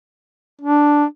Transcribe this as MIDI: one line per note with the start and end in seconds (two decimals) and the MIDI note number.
0.61 1.05 62